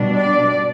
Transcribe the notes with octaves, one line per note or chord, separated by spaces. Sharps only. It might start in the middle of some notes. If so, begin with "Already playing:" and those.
Already playing: B2 G3 D4
D5